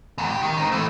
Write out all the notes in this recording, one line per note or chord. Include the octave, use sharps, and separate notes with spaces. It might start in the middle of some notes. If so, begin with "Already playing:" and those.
E2 G#2
G4
D#3
C4 D#4
E3 A3